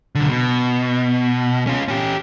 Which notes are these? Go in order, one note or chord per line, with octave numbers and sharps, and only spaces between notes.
B1 D3
B2
C#4 F4
C#4 G4